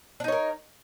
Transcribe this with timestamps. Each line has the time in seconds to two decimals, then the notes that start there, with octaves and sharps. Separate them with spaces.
0.20 D4
0.24 D#4
0.28 C#5
0.32 A#4